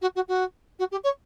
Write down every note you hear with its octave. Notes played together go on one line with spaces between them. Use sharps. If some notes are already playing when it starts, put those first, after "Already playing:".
F#4
F#4
F#4
F#4
G4
C#5